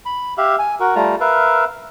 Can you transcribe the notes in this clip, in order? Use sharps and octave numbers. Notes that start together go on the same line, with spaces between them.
B5
G4 E5 F5
G#5
F#4 A#4
G3 A3 F4 A#5
A#4 B4 E5 F5